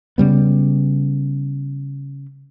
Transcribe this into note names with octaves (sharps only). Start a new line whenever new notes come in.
C#3 G3 B3